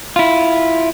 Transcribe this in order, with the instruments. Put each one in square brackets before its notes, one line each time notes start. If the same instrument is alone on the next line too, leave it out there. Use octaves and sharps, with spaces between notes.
[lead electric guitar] E4 F4